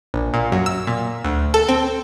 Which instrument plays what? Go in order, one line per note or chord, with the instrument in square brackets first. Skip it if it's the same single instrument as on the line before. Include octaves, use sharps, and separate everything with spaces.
[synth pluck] A#1
A#2
F#2
E6
A#2
D2
A4
C4